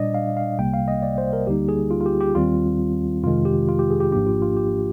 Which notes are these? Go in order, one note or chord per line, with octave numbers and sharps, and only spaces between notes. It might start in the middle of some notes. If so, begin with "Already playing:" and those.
Already playing: A#2 G3 D4 D5 D#5
F5
F5
C2 C3 G3 A#3 G5
F5
D#5
D5
C5
A#4
D2 D3 G3 A#3 D#4 G4
G#4
F4
F4
G4
G4
D#2 D#3 G3 C4 F4
F2 C3 D#3 G#3 F4
G4
F4
G4
G#4
G4
G#1 G#2 F3 A#3 D4 G4
F4
F4
G4